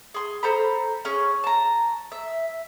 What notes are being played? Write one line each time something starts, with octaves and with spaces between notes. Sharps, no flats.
G#4 C6
A4 C5 A#5 B5
C#4 G#4
A5 A#5
E5